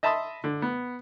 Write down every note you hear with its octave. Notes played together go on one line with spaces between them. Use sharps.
D#5 E5 A5 B5 C6 D#6
D3
B3